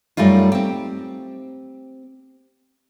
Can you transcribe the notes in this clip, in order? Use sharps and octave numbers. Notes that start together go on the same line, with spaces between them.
F#2 G3 A3 D#4 F4
C4 G4